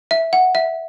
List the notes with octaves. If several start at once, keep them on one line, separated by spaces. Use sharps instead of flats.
E5
F#5
E5